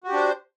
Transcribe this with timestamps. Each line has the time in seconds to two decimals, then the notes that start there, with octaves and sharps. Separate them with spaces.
0.04 F#4
0.08 G4
0.13 D4
0.17 C5